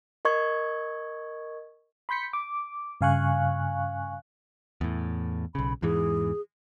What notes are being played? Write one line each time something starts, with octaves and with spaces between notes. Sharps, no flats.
A#4 D#5 C#6 G#6
B5 C6 G6 B6 C#7
D6
G2 C#3 F5 G#5 C#6 F#6
E2 A2
B1 C#3 B5
E2 G#2 E3 G#4